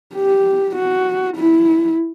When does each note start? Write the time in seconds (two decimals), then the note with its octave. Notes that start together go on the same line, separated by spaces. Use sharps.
0.16 G4
0.76 F#4
1.37 E4